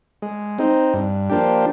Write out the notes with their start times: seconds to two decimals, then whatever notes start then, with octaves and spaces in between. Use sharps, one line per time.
0.22 G#3
0.58 C4 D#4
0.94 G2
1.30 F3 A#3 D4 G4